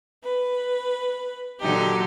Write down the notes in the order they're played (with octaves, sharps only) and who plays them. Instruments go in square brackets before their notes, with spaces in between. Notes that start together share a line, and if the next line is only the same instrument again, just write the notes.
[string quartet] B4
A#2 D3 F#3 D#4 G4